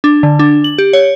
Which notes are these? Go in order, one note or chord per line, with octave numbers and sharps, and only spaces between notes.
D4
D3
D4
F#7
G4
C#5